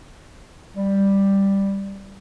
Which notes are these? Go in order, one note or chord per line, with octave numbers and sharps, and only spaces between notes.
G3